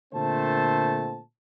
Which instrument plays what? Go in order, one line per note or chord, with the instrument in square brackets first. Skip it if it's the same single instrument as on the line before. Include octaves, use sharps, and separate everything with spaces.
[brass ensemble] A#2 D3 A3 C4 C5 A5